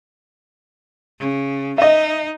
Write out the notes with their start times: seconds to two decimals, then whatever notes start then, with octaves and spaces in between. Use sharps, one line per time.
1.19 C#3
1.78 D#4 D#5 E5